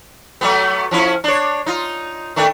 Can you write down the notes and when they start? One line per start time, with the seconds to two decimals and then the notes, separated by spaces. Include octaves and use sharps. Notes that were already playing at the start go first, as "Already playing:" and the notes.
0.41 F#3 A3 B3
0.91 F3 C#4 E4
1.24 D4 C#5
1.66 D#4 F4
2.36 D#3 A3 D4